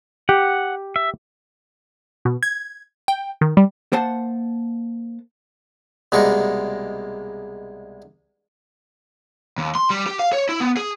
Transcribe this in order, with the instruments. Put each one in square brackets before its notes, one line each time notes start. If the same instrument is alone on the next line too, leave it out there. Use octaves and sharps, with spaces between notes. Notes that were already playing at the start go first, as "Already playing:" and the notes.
[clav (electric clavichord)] G4 [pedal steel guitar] F#5
[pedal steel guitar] E5
[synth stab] B2
G#6
G5
D#3
G3
[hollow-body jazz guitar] A#3 C5 F#5 A5
[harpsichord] C2 B2 G#3 A#3 C#6
[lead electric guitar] D#2
C6
G3
G4
F5
C#5
E4
B3
G#4